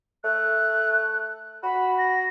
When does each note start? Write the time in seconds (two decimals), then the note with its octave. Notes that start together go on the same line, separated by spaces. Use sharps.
0.24 A3 F#6
1.63 F#4 B5
1.98 A#6